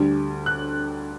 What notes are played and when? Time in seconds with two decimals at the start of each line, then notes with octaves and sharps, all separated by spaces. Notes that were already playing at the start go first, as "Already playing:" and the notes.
Already playing: D2 D3 G3
0.46 F#6